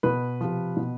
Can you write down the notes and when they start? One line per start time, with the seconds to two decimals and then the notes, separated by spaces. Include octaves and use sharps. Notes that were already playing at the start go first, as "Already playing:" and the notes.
0.03 B2 B4
0.41 C3 F3
0.77 B2